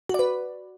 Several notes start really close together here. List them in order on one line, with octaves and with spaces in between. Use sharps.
F#4 D5 B4